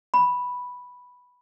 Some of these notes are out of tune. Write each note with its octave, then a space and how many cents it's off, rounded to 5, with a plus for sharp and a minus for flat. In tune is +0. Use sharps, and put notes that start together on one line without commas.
B5 +0